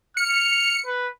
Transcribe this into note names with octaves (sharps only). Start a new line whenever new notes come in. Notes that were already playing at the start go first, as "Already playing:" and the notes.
F6 C#7
B4